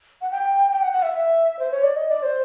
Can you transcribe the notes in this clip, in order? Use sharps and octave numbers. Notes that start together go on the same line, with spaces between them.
F#5
G5
G5
F#5
F#5
E5
E5
C5
C#5
D5
D#5
D5
C5